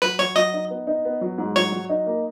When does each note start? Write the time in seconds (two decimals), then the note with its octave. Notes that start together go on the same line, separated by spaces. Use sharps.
0.02 F#3 B4
0.19 F#3 C#5
0.36 F#3 D#5
0.53 D#4
0.70 B3
0.87 D#4
1.05 B3
1.21 F#3
1.38 G#2
1.56 F#3 C#5
1.72 F#3
1.89 D#4
2.06 A#3